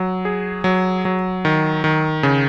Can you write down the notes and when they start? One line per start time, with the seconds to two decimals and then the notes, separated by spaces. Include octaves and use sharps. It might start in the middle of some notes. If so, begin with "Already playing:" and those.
Already playing: F#3
0.25 G#4
0.64 F#3
1.05 F#3
1.45 D#3
1.84 D#3
2.23 C#3